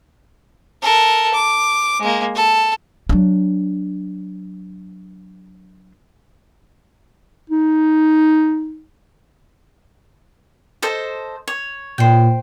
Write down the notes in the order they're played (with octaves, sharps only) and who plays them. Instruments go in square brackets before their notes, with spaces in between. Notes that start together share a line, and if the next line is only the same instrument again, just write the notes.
[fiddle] A4 A#4
D6
G#3 A#3
A4
[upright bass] F#3 D4
[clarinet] D#4
[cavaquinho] A4 C5 D#5
C#5
[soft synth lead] A#2 [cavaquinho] C5 G5